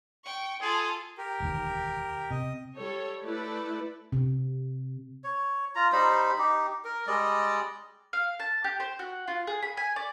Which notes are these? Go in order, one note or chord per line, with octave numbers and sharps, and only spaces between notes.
G5 C#6
F4 G#4 A4
G4 A#4
E1 D2 D#3
C3 D#5
G3 A4 C#5
A3 E4 A4 B4 D5
C3
C#5
F4 A#5
G3 D#4 C5 B5
D#4 G4
A#4
G3 G#3 D5 D#5
F5
A5
G4
C5
F#4
F4
G#4
B5
G#5
D5